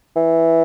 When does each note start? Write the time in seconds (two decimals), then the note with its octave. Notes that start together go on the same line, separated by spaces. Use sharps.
0.16 E3